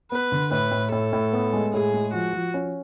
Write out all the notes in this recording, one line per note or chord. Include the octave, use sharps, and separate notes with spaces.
B3 B4
D3
A2 B4
A2
A2 A4
A2
B3
G#3
A2 G#4
G#3
F3 F#4
F3
C#4